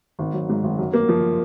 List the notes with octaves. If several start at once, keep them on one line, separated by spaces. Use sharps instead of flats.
G#1
F#3
G#2
G#1
F#2
A#3
F3